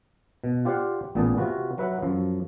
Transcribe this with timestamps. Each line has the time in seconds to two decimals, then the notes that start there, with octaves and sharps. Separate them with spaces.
0.44 B2
0.65 F4 G4 C5 D5 F5 F#5
1.15 A1 A#2 B3 G#4 A5
1.38 C3 F4 F#4 B4
1.78 F#3 B4 E5 F#5
2.02 F#2 F3